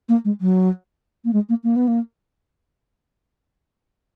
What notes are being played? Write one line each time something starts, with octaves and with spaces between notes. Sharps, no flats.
A#3
G#3
F#3
A#3
G#3
A#3
A#3
B3
A#3